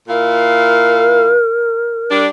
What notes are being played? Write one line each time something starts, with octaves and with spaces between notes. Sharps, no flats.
A#2 E4 A#4 F5
G3 D4